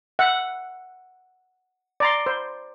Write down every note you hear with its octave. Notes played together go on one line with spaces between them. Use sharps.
E5 F#5
D5 A#5 C6
C5